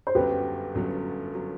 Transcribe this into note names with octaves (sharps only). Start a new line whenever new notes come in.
C5
G1 F#2 F#3 G4 B4
G1 F#2 F#3
F#3